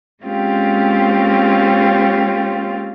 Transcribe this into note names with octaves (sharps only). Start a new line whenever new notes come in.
G#3 A#3 C4 C#4 F4 G4